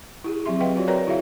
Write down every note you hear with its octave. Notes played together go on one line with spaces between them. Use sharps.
E4 G4 G#4
F#3 C4 G4 E5 C6
B4 D#5 F5 G5
F4 F#4 C#5 D5
A#4 B4 C#5 D5 G5 A#5
E4 F#4 G#4 C#5 E5 F5